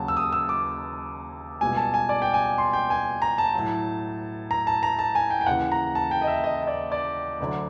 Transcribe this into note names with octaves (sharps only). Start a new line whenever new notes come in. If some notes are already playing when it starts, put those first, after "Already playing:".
Already playing: D#2 C#3 F#3 A5
E6
D#6
E6
D6
C#2 B2 G3 G#5
A5
G#5
D5
G5
G#5
C6
G5
G#5
A#5
A5
A2 F#3
A#5
A5
A#5
A5
G#5
G5
G5
D#2 C#3 E3 F#5
A#5
A5
G5
D#5
E5
D#5
D#5
D5
D5
D2 D3 F#3